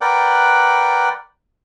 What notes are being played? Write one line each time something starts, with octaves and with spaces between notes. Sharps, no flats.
A#4 B4 D5 F#5 G5